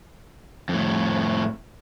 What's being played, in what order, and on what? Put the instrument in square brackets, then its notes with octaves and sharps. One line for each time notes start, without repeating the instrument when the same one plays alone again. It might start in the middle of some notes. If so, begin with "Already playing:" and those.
[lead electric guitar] F2 A2